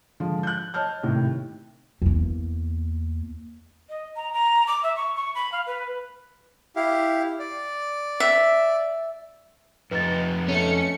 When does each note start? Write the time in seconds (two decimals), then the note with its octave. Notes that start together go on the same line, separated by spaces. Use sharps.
0.20 D3 F3 G#3
0.43 F#6 G6
0.74 C#5 D#5 A5 F6 G6
1.03 A2 C3 D#3
2.02 E2 A#3
3.89 D#5
4.16 A#5
4.33 A#5
4.67 D6
4.83 E5
4.96 C#6
5.16 C#6
5.35 B5
5.52 F5
5.67 B4
6.76 E4 G4 F5
7.39 D5
8.20 E5
9.91 F2 D#4 B4 A6
10.48 A3 C#4 C#7